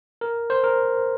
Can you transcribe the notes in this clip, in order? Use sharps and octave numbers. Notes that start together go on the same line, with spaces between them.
A#4
C5
A#4